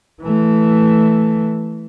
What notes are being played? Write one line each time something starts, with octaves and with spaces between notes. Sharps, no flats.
E3 A3